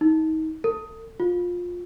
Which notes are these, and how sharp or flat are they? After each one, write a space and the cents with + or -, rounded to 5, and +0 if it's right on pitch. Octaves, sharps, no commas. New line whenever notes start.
D#4 +30
A4 +35
F4 +20